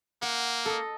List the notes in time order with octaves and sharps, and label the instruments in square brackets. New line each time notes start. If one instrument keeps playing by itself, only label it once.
[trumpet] A#3 [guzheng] F#5
[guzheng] A4 D#5